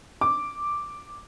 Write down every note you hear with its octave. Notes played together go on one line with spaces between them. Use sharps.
D6